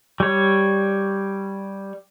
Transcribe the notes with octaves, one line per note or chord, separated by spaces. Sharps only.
G3 C#5